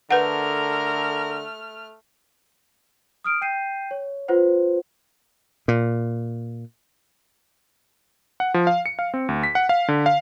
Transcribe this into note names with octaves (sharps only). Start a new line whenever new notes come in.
D3 A3 A#4 B4 F#5 F6
D#6 F6 D7
G5 G6 C7 D#7
C#5
F4 B4 C5 F#5
A#2
F#5
F3
F5
C#7
F5
C4
D2
B6
F#5
F5
D3
F5